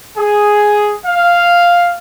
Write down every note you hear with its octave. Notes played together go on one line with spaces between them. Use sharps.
G#4
F5